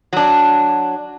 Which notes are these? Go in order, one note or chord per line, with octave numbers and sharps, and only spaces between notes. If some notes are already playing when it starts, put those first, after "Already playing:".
F#3 D4